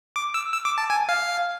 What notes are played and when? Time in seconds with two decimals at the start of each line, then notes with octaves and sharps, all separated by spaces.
0.16 D6
0.34 E6
0.53 E6
0.65 D6
0.78 A5
0.90 G#5
1.09 F5